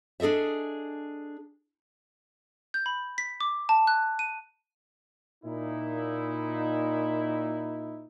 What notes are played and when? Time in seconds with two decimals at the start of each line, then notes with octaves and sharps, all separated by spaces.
0.20 D4 G#4 A4 D#5 E5
2.74 G6
2.86 B5
3.18 B6
3.41 D6
3.69 A5
3.87 F#6
4.19 D#7
5.44 A#2 D#4 E4